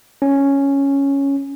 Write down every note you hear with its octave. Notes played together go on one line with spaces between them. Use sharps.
C#4